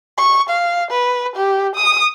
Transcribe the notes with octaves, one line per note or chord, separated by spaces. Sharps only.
C#6
F5
B4
G4
D#6